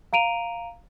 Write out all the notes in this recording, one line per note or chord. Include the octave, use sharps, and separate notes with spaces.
F5 A#5 D7 D#7 F7